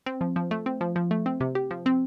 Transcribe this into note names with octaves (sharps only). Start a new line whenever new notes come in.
C4
F3
F3
A3
C4
F3
F3
A3
C4
C3
G4
F3
C4